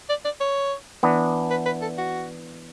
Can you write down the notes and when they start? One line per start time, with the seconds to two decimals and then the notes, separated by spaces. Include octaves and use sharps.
0.09 D5
0.25 D5
0.41 C#5
1.03 E3 B3 D4
1.50 B4
1.66 B4
1.82 A4
1.98 F#4